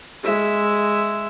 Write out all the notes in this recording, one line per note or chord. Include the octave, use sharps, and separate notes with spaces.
G#3 E5